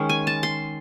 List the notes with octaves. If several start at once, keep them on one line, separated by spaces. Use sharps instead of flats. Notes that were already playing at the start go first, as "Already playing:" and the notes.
Already playing: D#3 G#3 C#4
G#5
A5
C6